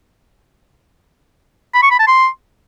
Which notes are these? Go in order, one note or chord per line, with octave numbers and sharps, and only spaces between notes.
B5
C#6
B5
A5
C6